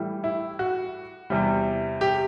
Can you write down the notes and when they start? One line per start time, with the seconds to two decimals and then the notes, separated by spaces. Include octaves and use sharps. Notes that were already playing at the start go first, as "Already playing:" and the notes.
Already playing: A2 E3 G3
0.24 E4
0.59 F#4
1.30 E2 C3 G3
2.01 G4